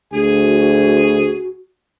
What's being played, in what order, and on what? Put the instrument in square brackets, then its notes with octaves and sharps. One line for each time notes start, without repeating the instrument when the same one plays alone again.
[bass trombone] D2 [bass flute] F#4 [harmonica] G#4 G#5